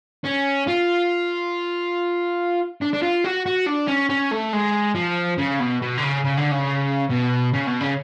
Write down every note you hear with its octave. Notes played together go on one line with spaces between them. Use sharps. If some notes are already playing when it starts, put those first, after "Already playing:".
C#4
F4
D4
D4
F4
F#4
F#4
D4
C#4
C#4
A3
G#3
F3
C#3
B2
B2
D3
C#3
C#3
D3
C#3
B2
C#3
B2
C#3